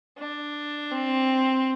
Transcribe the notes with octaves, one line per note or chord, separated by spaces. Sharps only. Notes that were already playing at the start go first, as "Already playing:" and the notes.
D4
C4